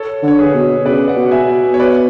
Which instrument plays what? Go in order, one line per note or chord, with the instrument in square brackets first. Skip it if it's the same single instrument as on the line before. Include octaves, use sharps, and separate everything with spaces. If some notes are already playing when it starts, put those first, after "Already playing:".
Already playing: [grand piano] A4 C#5
[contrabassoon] D3
[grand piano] C#5
G#4 B4
[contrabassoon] B2
[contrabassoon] C#3 [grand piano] B4 D5
[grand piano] D5 F#5
[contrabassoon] B2
[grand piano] E5 G#5
[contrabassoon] B2
[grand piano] C#5
B4 D5